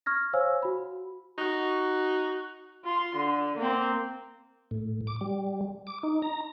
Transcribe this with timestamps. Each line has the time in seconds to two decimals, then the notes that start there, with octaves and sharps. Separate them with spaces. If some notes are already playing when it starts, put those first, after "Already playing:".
0.06 C#6 F6 G#6 A#6
0.33 C5 C#5 F5 G#5 E6
0.63 F#4 B5
1.38 D#4 F#4
2.85 F4 C6
3.15 D3
3.57 A#3 C4
4.71 A2
5.07 D6
5.21 G3
5.87 D6
6.03 D#4
6.22 A#5